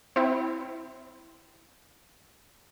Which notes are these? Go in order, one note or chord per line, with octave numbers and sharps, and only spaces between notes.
C4 E4